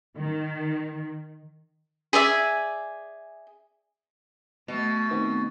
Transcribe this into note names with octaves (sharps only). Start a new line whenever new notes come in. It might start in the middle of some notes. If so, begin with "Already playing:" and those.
D#3
G#4 D5 E5 G#5
B2 A3
D#3 B3 C4